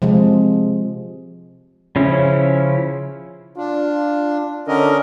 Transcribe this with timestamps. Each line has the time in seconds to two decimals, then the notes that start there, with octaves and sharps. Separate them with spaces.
0.02 C3 F3 G#3
1.96 C#3 F3 C#4 E4
3.57 D4 F4
4.68 D3 C#4 A#4 D#5